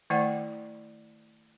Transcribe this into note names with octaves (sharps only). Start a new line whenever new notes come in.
D#3 A3 E4 D5 F#5